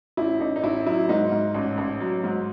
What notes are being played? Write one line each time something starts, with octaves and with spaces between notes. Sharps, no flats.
A1 E4
A1 D#4
D#4
A1 E4
F#3 E4
G#2 D#4
G#2
A1
A1
F#3
G#2